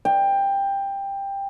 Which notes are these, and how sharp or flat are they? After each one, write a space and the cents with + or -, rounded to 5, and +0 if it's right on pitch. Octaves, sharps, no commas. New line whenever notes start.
G5 +15